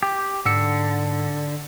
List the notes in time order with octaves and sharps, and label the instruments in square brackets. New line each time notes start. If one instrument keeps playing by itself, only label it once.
[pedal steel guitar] G4
[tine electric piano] G#2 E6 C#7 [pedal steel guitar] D3